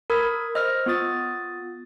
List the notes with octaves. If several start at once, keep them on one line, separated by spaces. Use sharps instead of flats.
A#4 B5 D#6 E6 G#6
C5 D#5 E6 F6 A#6
B3 F4 D#6 A6